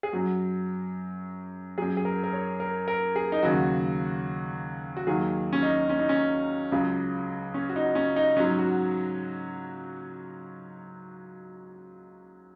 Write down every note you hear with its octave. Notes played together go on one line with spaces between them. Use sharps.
G#4
F#2 F#3 F#4
F#2 F#3 G#4
G#4
A#4
A#4
C#5
A#4
A#4
G#4
D#4
D#2 C#3 F#3 F#4
F#4
D#2 D#3 F#3 G#4
C#4
D#4
C#4
D#4
C#4
C#2 C#3 F#3
C#4
F#4
D#4
C#4
D#4
G#2 F#3 C#4
F#4